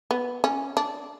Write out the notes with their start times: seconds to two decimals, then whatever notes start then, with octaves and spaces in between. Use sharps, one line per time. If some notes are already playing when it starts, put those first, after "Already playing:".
0.11 B3
0.44 C#4
0.77 D4